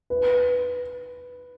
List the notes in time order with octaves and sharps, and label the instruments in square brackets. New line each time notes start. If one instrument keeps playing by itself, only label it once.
[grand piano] B4